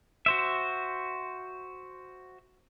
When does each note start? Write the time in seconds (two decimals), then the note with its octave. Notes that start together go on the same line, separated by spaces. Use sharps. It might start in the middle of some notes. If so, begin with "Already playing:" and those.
0.26 F#4 C5 E5